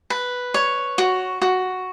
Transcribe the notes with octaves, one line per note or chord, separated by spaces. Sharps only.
B4
C#5
F#4
F#4